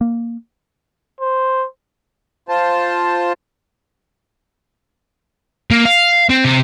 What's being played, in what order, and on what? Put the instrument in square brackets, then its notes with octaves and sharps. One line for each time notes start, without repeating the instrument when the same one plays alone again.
[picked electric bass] A#3
[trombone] C5
[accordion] F4 C5 A5
[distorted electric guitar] A#3
F5
C4
C3